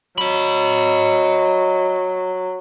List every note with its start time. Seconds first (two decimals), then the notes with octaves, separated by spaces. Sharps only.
0.18 F#3 D#5 B5